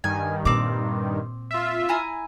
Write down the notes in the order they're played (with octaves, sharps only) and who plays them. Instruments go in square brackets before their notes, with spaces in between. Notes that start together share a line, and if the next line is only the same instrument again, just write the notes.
[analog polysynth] G2 D#3 [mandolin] G#5
[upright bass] A#2 [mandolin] C4 D6
[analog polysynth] F4 E5
[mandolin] E4 G#5 A#5